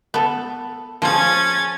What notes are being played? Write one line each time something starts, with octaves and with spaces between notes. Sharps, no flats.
B3 A4
F3 C#4 G#4 G#6 A6